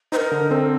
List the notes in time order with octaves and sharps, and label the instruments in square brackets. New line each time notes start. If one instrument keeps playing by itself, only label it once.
[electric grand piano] D#4 [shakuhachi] C5
[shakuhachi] A#4
[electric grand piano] D3
[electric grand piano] C4 [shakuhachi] A4